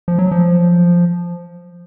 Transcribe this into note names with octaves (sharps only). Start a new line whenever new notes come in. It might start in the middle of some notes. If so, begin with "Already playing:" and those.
F3
F#3
F3